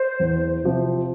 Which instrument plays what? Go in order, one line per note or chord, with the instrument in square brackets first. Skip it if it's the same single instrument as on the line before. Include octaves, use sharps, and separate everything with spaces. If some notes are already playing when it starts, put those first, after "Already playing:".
Already playing: [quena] C5
[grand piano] E2
C3 F3 C4